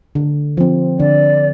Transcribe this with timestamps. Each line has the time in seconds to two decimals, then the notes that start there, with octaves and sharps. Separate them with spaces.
0.15 D3
0.57 F3 C4
0.99 D3 D5